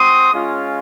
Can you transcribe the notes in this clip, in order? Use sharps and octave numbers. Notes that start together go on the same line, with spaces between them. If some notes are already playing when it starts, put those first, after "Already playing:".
Already playing: C4 F#4 C6 D#6
G#3 C#4 F4